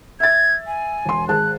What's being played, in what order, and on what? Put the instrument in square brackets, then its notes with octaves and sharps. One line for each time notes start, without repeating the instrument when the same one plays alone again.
[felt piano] E5 A6 [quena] G#6
[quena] G#5
[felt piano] E1 C6
[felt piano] G#1 G#4 A5 [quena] F#6